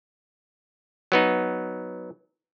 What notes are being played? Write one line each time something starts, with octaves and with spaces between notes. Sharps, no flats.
F#3 B3 D#4